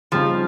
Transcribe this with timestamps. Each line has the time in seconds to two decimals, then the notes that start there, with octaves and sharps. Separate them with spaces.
0.12 C#3 F3 G3 C4 D#4